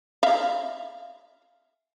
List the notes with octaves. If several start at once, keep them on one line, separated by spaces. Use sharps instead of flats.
E5 F5